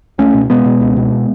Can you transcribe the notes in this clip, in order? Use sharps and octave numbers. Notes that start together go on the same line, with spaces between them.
C#2 A3 C#4
B2
B2 G#3 B3
B2
C#2
B2